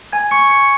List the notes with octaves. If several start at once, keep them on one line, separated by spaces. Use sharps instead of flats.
G#5 G#6
C#6 C#7
C#6 C#7